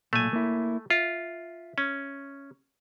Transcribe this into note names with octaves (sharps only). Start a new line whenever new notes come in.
B1 A#2 A3 G#5
A#3 E4
F4 E5
C#4